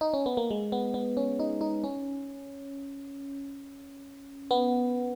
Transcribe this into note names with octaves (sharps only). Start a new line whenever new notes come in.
D#4
C#4
B3
A#3
G#3
B3
B3
C#4
D#4
D#4
C#4
B3